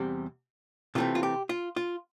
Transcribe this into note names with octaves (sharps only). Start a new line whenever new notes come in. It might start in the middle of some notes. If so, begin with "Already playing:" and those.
Already playing: E2 C3 G3 C4
C3 E3 A3 C4 F4
F4
G4
F4
F4